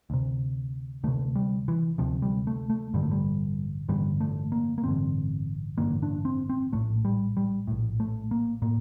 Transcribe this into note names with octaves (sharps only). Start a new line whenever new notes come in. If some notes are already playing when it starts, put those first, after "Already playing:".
D2 C3
D2 C3 A3
G3
E3
D2 C3 F3
G3
A3
A3
A1 G2 D3 G3
A3
G3
A1 G2 D3 G3
A3
A#3
A#3
A1 G2 D3 C4
A1 G2 D3 A#3
D4
C4
C4
A#1 A2 A3
G3
G3
A#1 A2
A3
A#3
A2 A#3